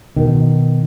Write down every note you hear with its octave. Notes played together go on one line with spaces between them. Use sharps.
B2 D#3